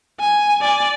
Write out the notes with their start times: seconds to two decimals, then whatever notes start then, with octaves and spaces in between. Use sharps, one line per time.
0.20 G#5
0.62 D5 G#5